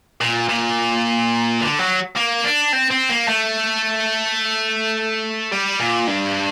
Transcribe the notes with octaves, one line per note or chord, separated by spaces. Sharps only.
A#2
A#2
D3
F#3
A#3
D4
C4
C4
A#3
A3
G3
A#2
G2